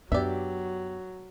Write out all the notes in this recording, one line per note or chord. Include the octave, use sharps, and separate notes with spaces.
F#2 F#3 B3 D4 G4 D5 E5